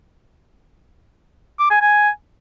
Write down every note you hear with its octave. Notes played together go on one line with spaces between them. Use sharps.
D6
G#5
G#5